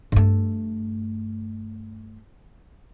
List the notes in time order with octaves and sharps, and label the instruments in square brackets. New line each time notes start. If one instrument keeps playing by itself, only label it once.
[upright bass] G2 A3